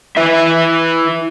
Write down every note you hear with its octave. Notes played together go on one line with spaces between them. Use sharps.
E4 B4 E5